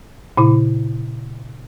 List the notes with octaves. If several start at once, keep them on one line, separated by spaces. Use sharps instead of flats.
A#2 C#3 E4